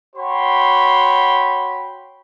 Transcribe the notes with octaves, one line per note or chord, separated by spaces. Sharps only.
F#4 C#5 G5 B5 C6